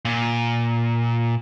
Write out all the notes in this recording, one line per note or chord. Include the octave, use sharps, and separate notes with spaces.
A#2